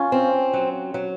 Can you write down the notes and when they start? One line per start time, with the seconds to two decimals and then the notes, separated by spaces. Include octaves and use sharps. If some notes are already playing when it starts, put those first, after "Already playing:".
Already playing: C#4 F4
0.12 C4
0.53 F#3
0.94 F#3